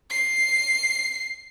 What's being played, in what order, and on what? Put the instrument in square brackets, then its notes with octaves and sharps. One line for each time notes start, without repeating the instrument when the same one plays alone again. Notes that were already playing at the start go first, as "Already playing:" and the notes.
[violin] C7